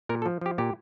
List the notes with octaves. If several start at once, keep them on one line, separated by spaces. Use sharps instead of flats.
A#2 A#4
A4
F3
F3 G4
A#2 G4